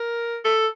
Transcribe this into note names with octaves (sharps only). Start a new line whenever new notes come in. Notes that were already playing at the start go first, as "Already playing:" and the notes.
Already playing: A#4
A4